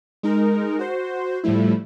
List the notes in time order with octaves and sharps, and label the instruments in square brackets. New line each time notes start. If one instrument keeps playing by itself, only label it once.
[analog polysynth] G#3 D#4 A#4
F#4 C5
A2 F3 G3 A3 E4